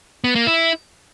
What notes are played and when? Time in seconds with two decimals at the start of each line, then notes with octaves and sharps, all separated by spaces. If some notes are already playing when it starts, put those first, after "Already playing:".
0.24 B3
0.35 A#3
0.47 E4